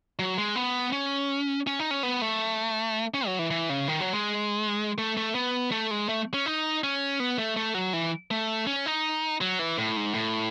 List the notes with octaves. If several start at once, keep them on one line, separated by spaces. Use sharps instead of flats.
F#3
G#3
B3
C#4
C#4
D#4
C#4
B3
A3
C#4
F#3
E3
E3
C#3
D#3
F#3
G#3
A3
A3
B3
A3
G#3
A3
C#4
D#4
C#4
B3
A3
A3
F#3
E3
A3
C#4
D#4
F#3
E3
A2
G#2
A2